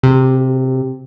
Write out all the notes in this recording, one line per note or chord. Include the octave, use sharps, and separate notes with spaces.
C3